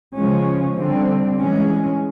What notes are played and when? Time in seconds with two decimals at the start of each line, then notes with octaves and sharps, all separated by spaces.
0.15 C#3 F3 G#3 C#4
0.77 D3 G3 C4
1.40 E3 G#3 C#4